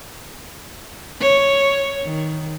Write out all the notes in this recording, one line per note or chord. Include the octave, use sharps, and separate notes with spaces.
C#5
D#3